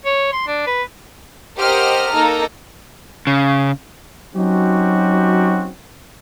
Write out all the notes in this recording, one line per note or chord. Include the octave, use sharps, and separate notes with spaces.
C#5
C6
D4
B4
G4 A#4 C5 D#5 F#5 F6
A#3 D#4 A4 A#5
C#3
F#3 C4 C#4 D#4 F#4 G4